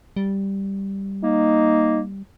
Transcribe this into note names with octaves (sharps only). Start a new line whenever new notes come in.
G3
A#3 D#4